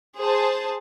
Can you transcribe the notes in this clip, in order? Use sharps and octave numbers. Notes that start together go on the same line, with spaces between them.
G#4 C5 A5